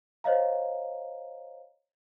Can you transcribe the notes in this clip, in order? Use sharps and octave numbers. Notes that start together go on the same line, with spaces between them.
C5 C#5 D#5 F5 A#5